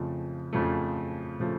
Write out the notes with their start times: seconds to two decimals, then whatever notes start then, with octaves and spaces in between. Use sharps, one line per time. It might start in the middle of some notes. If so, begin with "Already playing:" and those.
Already playing: F2 C#3 F3 A3
0.53 F2 C#3 F3 A3
1.40 C#3 F3 A3